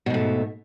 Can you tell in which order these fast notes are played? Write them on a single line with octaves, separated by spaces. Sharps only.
B2 G#2 A3